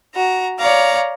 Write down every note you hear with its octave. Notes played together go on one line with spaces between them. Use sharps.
F#4 A#5
C#5 D5 F5 A#5